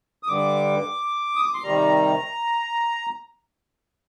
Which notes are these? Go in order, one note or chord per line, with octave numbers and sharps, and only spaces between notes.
D#6
G2 D3 G3 D6
D#6
D6
C6
C3 D#3 G3 A#5